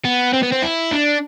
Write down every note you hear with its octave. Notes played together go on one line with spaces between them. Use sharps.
B3
C4
B3
C4
E4
D4